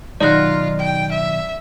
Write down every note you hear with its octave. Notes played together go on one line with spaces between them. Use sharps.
B2 D#3 F#3 D#4 F4 D5 F#5 A#6
G5
E5